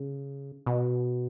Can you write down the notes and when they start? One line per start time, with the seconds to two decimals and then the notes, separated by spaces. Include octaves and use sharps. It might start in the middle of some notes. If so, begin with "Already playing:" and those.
Already playing: C#3
0.66 B2